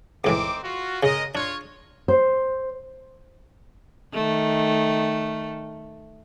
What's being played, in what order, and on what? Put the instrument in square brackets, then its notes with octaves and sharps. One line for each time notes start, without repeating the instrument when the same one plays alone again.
[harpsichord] C#2 A2 E3 [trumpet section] C4 D#4 D6
[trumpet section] F4 F#4
[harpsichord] C#3 [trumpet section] G#3 A#4 D#5
[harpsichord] D4 [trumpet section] F4 C#5
[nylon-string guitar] C5
[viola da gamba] D#3 A3